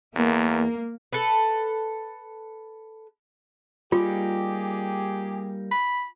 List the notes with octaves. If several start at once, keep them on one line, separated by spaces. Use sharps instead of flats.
E2 A#3
A4 B4
G3 A#3 D#4 F4 G4 G#4
B5